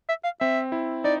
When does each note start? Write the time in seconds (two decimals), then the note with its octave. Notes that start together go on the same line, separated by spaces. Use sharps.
0.09 E5
0.24 F5
0.40 C4 E5
0.72 E4
1.04 D#4 D5